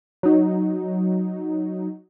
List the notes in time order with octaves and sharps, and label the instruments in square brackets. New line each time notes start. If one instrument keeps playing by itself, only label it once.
[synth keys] F#3 D#4